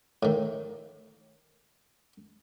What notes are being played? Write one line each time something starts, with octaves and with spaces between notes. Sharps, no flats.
A2 D#3